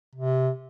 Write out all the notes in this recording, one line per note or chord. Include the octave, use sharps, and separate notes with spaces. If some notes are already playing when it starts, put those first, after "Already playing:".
C3